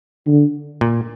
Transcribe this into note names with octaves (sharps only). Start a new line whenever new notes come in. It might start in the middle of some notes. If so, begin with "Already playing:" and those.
D3
A#2